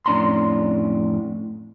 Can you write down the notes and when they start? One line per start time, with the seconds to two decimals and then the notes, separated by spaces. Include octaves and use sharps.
0.06 F2 A2 C#4 D4 A#5 C6